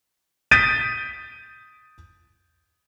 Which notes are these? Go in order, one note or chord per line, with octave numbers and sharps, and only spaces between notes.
D#6 G6 A6 B6 D7 D#7